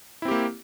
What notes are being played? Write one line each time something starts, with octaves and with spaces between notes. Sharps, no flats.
A#3 C4 E4 G4